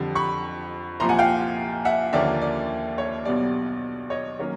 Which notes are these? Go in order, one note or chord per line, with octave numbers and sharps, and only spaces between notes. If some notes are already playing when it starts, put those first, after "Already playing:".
Already playing: F2 D3 G3
B5 C#6
C2 A#2 F3 A#5 C6
F#5 G#5
F5 G5
E5 F#5
D#2 D3 F3 A#3 C#4 D5 E5
D5
C#5
B1 B2 G3 D5
C#5 D#5
D#3 F#3 A#3 C#4